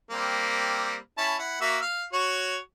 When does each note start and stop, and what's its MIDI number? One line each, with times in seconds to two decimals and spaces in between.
0.11 0.96 55
0.11 0.96 58
0.11 0.96 60
1.18 1.35 61
1.18 1.35 64
1.18 1.35 81
1.39 1.60 64
1.39 1.60 78
1.61 1.78 58
1.61 1.78 66
1.61 1.78 76
1.81 2.04 77
2.13 2.57 66
2.13 2.57 73